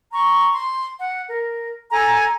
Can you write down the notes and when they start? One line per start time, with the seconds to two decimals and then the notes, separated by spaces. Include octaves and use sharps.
0.12 A#5 C#6
0.53 C6
0.99 F#5
1.29 A#4
1.91 A4 G#5 A#5